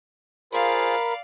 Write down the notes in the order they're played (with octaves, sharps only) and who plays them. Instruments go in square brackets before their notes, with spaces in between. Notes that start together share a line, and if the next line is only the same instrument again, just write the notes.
[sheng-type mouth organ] F4 G#4 C5 [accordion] A#4 B5 [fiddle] D5 F5